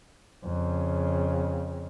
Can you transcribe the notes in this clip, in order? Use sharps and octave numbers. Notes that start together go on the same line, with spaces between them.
F2 C#3